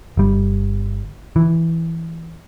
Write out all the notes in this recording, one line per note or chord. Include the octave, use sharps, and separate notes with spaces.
G1 G3
E3